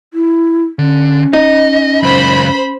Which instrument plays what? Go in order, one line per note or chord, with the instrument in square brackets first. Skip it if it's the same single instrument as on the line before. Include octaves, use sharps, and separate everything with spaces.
[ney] E4
[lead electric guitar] D3 [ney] C#4
[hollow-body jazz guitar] D#4 [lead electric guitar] D#5
[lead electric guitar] C#2 F#2 [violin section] C5 B5